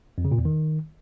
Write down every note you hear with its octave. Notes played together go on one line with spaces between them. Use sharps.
F2
C#3
A#2
E2
D#3